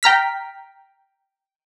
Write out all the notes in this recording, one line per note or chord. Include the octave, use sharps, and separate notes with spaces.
G5 A#5 F6 B6